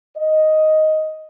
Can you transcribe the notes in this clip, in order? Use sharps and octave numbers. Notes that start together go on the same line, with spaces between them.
D#5